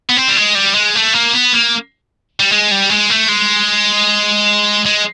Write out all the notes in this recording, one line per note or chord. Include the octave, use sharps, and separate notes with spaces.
B3
C4
G3
G#3
G3
G#3
A3
A#3
B3
A#3
G3
G#3
G3
G#3
A3
G#3
G#3